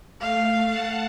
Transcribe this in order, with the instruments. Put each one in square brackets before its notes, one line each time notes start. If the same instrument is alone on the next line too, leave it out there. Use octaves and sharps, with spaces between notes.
[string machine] A3 [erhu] F5
[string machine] F#5 A5